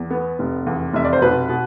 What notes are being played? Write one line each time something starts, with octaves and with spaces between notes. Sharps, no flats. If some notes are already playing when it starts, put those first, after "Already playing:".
Already playing: E2
B3
F1
E2
F1 E5
D5
C5
B2 B4
B2